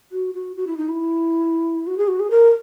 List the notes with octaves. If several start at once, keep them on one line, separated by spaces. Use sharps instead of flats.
F#4
F#4
F#4
E4
D#4
E4
F#4
G#4
F#4
G#4
A#4